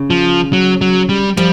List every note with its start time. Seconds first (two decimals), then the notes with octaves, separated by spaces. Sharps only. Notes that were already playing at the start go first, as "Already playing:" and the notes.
Already playing: C#3
0.10 F3
0.53 F#3
0.81 F#3
1.09 G3
1.37 F3 G3